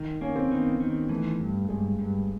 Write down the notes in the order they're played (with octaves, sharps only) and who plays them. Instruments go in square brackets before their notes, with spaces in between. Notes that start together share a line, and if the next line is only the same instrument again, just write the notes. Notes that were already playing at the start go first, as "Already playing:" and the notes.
Already playing: [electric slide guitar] D#3
[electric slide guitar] A#3 [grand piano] C#4
[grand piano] C4
[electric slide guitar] D#3 [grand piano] B3
[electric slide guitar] D#3
[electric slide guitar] E3 [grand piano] A3
[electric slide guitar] G2
[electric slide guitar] G2 [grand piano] G#3
[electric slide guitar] G2